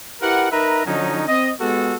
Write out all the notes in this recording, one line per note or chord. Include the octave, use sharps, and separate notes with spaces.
E4 G4 A#4 B4 F#5
D#4 A#4 B4 E5 A#5
D3 F3 F#3 C#4 D#4
C4 D#5
G#3 B3 F#4 G4 A4